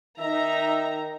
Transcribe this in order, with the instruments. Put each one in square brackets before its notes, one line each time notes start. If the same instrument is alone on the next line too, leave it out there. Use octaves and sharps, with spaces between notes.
[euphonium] D#3 [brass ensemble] D#4 [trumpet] E5 [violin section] A#5